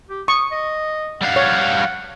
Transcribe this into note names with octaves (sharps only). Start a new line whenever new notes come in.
G4
C#6 D#6
D#5
G3 F5 F#5
C#5